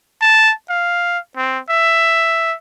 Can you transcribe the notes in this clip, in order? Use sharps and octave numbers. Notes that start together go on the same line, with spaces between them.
A5
F5
C4
E5